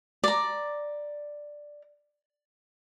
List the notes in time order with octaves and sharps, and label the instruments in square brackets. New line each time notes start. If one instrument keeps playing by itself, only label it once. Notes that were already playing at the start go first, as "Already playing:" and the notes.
[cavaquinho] D5 A#5